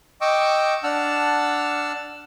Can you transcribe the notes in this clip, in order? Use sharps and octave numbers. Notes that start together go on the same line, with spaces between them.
D#5 G5 C#6 D6 E6
D4 F#5 A5 E6 F6